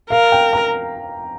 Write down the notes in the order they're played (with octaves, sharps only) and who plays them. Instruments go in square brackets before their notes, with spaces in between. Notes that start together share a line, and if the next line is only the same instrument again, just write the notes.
[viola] A#4 [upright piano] F5
[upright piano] G5
A#5